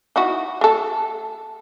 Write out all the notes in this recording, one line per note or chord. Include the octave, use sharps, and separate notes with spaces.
D#4 E4 F#4
A3 A4